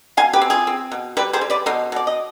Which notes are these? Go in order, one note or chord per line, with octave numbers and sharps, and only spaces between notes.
B2 F5 G#5
G4 B4
C4
F4 G#4
C4
B2
G3 G4 B4
G#4 C5
G3
B4 D5
B2 C5 D#5
B2 D5
D#5